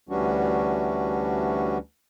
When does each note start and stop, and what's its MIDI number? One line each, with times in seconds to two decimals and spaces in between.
0.09 1.78 38
0.09 1.78 52
0.09 1.78 55
0.09 1.78 61
0.09 1.78 62
0.09 1.78 66